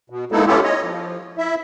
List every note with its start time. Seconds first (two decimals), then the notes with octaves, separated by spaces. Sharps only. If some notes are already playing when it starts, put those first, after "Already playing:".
0.10 B2
0.32 G#3 A#3 B3 D#4 E4 A4
0.47 B3 C#4 E4 F4 G4 A4
0.63 C#5 D#5
0.83 F3
1.38 E4 E5